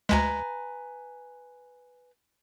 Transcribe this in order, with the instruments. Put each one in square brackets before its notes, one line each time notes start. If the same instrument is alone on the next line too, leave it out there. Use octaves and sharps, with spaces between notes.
[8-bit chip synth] D2 G#3 [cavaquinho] B4 G#5 A#5